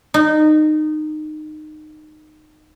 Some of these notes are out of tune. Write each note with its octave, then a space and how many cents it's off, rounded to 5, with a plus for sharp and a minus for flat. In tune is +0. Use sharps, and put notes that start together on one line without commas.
D#4 -20